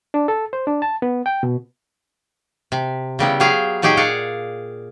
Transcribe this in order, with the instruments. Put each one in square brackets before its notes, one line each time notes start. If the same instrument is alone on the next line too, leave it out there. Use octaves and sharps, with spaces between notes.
[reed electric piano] D4
A4
C5
D4
A5
B3
G5
B2
[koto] C3
C#3 G3 B3 E4
F#3 B3 G4 G#4 F5
A#2 F#3 D#4 G4 G#4
G#4 D5 F5 F#5